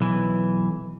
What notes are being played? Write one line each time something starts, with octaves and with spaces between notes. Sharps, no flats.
B1 E3